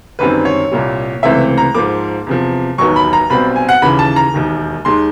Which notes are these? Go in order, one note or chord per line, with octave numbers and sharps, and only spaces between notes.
G1 F#2 D#3 G3 C4 B4
C#5
C2 A#2 G3
C#2 C3 E3 A3 C4 E5
A#5
G#2 F3 A#3 D6
E2 C3 F3
E1 D#2 D#3 F#3 B3 C#6
B5
A#5
B1 B2 G3 C4 B5
G#5
F#5
D#2 C#3 E3 B5
A5
A#5
E1 D#2 D#3
D#2 D#3 G#3 C6